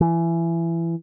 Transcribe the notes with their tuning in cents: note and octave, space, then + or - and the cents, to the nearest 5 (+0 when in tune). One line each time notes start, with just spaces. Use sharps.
E3 +20